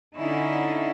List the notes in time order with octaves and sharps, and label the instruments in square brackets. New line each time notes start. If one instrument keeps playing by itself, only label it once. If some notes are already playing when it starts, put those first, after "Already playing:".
[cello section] D3 C#4 D#4 E4